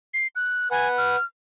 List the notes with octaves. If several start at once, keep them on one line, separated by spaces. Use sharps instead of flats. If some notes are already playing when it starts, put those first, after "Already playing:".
C7
F#6
B4 F#5 G#5
F6